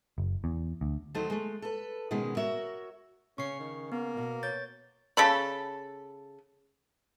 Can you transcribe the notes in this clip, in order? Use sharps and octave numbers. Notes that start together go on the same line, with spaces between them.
F#1
E2
D2
D#3 F#3 A3 D#4 A4 C5
G#3 A3
A4 B4
B2 D#3 G#3 B3 C#4
F#4 A#4 C#5 E5
C#3 C#4 C#6 C7
D#3
A#3 B3
B2
C#5 G6 A6
C#3 A4 B5